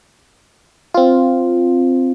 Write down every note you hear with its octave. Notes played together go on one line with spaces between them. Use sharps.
C4 F4